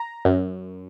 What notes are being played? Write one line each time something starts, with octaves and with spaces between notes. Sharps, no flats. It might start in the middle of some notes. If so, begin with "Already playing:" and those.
Already playing: A#5
F#2